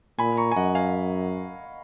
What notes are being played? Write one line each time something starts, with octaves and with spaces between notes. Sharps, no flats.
A#2 G#5 B5
A#5 C#6
G#5
F#2 D#5 F#5
F5 G#5